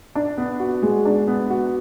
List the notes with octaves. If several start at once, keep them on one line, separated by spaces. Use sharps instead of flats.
D4
B3
F#4
G#3
D4
B3
F#4